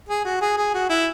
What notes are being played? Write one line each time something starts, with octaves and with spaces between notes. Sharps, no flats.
G#4
F#4
G#4
G#4
F#4
E4